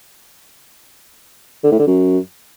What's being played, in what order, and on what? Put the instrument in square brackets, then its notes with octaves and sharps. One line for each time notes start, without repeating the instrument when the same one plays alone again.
[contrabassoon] D3
A2
D3
F#2